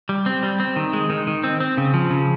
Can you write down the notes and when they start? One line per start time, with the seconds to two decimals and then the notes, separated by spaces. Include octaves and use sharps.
0.09 G3
0.26 C4
0.43 G3
0.60 C4
0.76 D#3
0.93 G#3
1.10 D#3
1.27 D#3
1.44 C4
1.60 C4
1.77 C#3
1.94 F3
2.11 C#3